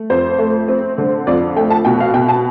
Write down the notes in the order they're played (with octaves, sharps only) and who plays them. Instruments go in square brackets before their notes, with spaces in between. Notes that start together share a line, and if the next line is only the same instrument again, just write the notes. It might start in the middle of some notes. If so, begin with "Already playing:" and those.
Already playing: [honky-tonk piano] A3
F2 C5
A3
C4
D3
F2 D5
A3 G5
A5
B2 G5
F5
B2 G5
A5